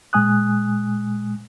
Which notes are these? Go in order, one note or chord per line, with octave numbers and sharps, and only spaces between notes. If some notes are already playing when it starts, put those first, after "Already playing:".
A#2 G#3 G#5 D#6 F#6